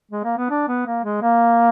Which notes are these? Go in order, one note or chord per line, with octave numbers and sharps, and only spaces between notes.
G#3
A#3
B3
D4
B3
A#3
G#3
A#3